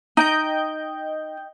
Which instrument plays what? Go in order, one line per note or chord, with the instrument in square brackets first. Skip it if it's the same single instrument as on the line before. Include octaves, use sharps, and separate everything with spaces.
[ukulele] D#4 [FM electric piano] D#5 G5 G6